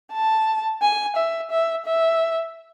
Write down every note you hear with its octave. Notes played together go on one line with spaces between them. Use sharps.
A5
G#5
E5
E5
E5